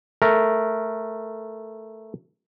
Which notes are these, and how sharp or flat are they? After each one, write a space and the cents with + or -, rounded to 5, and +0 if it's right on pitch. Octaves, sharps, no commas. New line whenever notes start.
A3 +0 A#4 +0